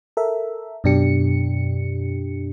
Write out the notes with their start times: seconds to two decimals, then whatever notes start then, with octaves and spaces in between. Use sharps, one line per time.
0.17 A4 A#4 E5
0.84 F#2 B2 D4 G4 C#7